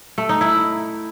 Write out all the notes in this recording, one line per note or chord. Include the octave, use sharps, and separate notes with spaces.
A3
D#4
E4